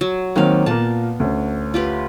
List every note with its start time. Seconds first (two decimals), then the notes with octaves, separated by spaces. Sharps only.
0.01 F#3
0.36 D#3 F#3 A#3 C4 F5
0.66 A#2 A#3 B3 A5
1.20 D2 C#4
1.74 F4 G4 B4